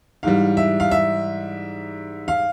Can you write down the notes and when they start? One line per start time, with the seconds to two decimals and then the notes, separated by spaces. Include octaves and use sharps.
0.23 G#2 E3 G3 F5
0.57 E5
0.80 F5
0.91 E5
2.28 F5